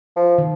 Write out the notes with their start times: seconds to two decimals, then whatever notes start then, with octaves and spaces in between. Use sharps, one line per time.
0.16 F3
0.38 D#3